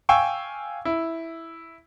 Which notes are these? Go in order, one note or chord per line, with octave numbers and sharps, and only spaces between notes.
F5 G5 G#5 C#6 E6
E4